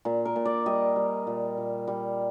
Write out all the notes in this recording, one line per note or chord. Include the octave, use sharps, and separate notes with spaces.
A#2
A#4
A#2
D5
G3 D#5
G3
A#2
A#2
G3